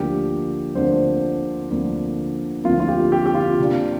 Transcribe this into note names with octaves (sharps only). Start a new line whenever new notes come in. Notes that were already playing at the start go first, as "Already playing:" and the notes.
Already playing: D2 D3 F3 A#3 G4
D2 D3 F3 A#3 C5
D2 D3 F3 A#3
D2 D3 F3 A#3 F4
F4
G4
G4
G4
F4
C3 A#3 D4